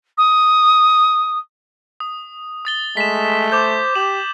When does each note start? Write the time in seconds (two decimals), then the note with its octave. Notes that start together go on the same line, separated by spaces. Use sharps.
0.17 D#6
2.00 D#6
2.65 D#6 A6 G7
2.97 G#3 A3 B6 E7
3.52 C5 D6 G6
3.95 G4 E7 F#7